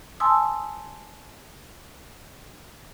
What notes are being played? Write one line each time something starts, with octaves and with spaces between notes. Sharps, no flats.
G#5 A5 C6 D#6 E6